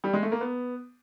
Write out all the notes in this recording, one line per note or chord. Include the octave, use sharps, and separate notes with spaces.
G3
G#3
A3
A#3
B3